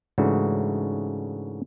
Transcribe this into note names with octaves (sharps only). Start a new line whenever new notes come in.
G#2 C#3 E3 A3 D4 F#4